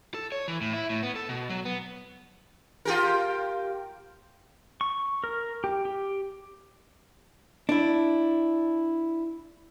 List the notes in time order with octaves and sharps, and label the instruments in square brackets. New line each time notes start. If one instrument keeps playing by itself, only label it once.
[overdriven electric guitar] A4
C#5
E3
A2
E4
A2
B3
A4
B2
F#3
B3
[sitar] F4 G4 A#4
[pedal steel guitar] C#6
A#4
G4
G4
[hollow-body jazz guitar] D4 E4